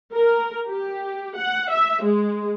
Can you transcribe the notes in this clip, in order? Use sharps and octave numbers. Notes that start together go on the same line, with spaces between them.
A#4
G4
F#5
E5
G#3